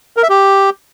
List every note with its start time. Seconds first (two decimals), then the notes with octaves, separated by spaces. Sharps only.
0.17 A#4
0.23 E5
0.29 G4